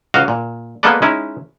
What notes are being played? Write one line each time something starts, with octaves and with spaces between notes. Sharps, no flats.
C#2 F#4 D#5 F5
A#2
G#3 A#3 B3 A4 B4 D5
G#3 C#4 D#4 E4